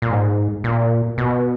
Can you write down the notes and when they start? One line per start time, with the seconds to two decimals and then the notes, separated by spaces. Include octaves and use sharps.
0.02 A#2
0.10 G#2
0.64 A#2
1.18 B2